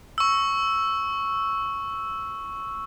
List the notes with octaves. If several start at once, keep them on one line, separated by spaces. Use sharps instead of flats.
C#6 E6